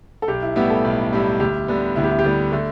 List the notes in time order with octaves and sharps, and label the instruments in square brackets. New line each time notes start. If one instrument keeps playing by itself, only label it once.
[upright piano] A4
[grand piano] B1 [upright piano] G4
[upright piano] E4
[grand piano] A2 G3 E4 G4 [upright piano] B3
[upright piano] A4
[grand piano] B1
A2 G3 E4 G4
[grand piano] D2 [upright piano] G4
[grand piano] D3 G3 B3
[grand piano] D2 [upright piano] E4
[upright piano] G4
E4
G4
[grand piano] D3 G3 B3 [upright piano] E4
[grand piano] D3 [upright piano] A3